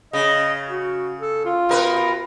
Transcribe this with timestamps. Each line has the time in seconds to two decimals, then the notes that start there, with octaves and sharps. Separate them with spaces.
0.13 C#3 D#5
0.67 F#4
1.20 A4
1.45 F4
1.69 B2 A#4 B4